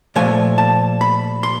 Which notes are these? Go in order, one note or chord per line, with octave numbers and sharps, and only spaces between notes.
A#2 F3 A3 G#5
A5
B5
C6